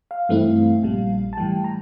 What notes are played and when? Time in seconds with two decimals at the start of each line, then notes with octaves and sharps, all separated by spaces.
0.11 F5
0.29 G2 E3 A3 C4 E4
0.83 A#1 A#2 G3
1.33 A5
1.37 A2 E3 G3 G5
1.64 A#5